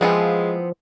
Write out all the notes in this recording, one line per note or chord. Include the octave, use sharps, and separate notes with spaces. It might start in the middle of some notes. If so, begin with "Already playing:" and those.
E3 F3 G#3 B3 C4